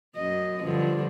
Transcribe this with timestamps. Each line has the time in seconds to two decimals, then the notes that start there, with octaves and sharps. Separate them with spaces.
0.16 F#2 D#5
0.64 G2 D3 F3